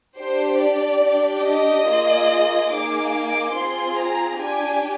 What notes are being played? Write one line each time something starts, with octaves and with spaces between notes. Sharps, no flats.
D4 G4 C5
D5
D4 G4
D#5
A#3 F4 G#4
A#3 D#4 G#4 D6
D6
C4 F4 G#4 C6
A#5
D4 G4 G#5